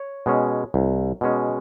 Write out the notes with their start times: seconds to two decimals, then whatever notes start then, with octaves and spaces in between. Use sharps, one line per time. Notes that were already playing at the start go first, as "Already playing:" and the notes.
Already playing: C#5
0.26 B2 G#3 C#4
0.74 C2
1.21 B2 G#3 C#4